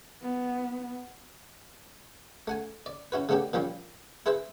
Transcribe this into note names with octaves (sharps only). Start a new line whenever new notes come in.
B3
A3 F#5 G#5
D5
C#4 E4 F#4 B4
C#3 A3 B3 D4 G4
A#2 F3 G3 C#4
E4 G#4 B4 C5 E5